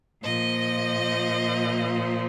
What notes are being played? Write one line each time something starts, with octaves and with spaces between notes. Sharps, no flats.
A#2 F3 D#5